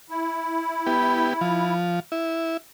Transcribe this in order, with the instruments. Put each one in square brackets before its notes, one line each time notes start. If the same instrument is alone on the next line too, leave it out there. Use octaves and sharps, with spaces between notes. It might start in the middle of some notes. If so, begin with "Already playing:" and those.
[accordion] E4
[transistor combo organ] B3 G4
F3
E4